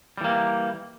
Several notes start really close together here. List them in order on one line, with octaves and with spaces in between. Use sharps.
G3 E3 A#3